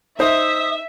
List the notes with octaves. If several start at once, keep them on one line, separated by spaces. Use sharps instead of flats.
D#4 C5 E5 D#6